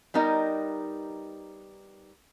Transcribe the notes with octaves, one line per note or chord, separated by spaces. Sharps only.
G3 B3 D#4 A#4 D#5